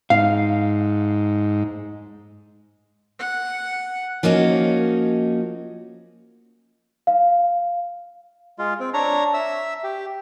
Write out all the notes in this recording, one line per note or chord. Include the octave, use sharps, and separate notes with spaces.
G#2 F5
F#5
F3 A#3 C#4 D#4 F#4
F5
G#3 F4
C4
D4 C#5 A#5
E5 E6
G4